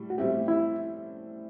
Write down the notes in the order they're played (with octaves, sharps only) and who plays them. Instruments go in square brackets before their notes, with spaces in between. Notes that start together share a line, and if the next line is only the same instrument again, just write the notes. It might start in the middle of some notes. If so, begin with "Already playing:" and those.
Already playing: [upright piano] A2 G3
[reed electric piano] F#4
[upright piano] A2 G3 C4 E4 [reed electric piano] G4
[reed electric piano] E4